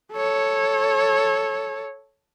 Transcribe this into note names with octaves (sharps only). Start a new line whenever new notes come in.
A4 C#5